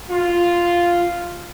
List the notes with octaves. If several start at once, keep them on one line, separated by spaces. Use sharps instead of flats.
F4